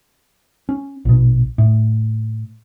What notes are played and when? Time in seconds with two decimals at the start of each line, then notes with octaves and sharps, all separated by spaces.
0.69 C#4
1.05 A#1 B2
1.58 A2